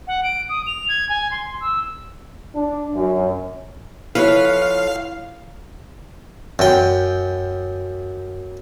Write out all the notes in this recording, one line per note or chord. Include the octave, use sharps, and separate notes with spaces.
F#5
D7
D#6
F7
G#6
G#5
C6
E6
D4
F#2
F3 E4 A4 B4 C#5 F5
F#2 G5